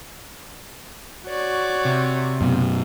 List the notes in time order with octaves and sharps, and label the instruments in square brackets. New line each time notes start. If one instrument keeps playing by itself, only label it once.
[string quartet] F#4 C#5 D5
[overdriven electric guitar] C3
[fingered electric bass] F#2 B2